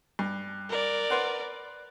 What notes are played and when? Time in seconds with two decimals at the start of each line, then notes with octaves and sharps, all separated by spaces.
0.19 G2
0.69 A#4 D5
1.10 B4 C5 F#5